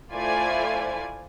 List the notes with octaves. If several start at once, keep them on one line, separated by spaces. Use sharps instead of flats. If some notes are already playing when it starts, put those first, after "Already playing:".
A3 E4 F4 C5 D5 G#5